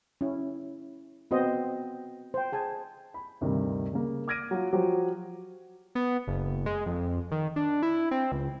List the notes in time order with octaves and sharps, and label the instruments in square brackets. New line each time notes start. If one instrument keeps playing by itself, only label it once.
[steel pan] C#4 E4
B3 C4 F#4 C5 D#5
C5 G5
G#4 G#5 A5
[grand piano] B5
D2 G2 C3 D#3
C#3 A#3
D6 F6 G#6 A#6 D7 D#7
F#3 F4
F3 F#3 F#4 G4
[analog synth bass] B3
F#1
G#3
F2
D#3
D4
E4
C4
C#2